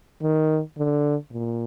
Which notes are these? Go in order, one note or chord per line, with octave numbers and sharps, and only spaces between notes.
D#3
D3
A#2